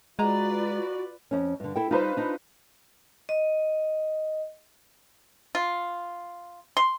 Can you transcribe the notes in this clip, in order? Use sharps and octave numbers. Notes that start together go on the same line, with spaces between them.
G#3 F4 F#4 B4 D5 D#5 A#5
F2 C#4
G2 D3
E4 A4 G5
G3 D#4 F4 B4 C5
D4 D#4
D#5
F4
C6